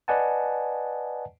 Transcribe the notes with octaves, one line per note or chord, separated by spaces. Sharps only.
B4 D5 D#5 F#5 G#5 A5